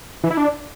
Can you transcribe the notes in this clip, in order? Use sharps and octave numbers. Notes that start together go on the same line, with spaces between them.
E3
E4
D4